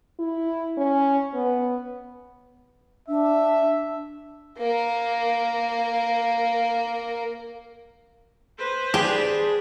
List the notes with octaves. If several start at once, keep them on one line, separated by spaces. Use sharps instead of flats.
E4
C#4
B3
D4 E5
A#3 A#4
B4 C5
D4 G4 G#4